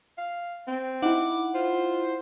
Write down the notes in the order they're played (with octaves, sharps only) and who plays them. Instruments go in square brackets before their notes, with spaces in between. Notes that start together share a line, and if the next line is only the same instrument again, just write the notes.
[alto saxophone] F5
C4
[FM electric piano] D#4 [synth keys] E4 F#5 [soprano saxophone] D6
[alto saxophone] F4 [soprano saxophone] C5